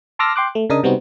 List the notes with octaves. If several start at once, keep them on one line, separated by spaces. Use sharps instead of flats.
A5 C6 D6 E6 F6 A#6
G5 C6 D6 F#6
A3
C#3 D4 A#4 D#5 D#6
C3 G3 B3 C4 D#4 F#4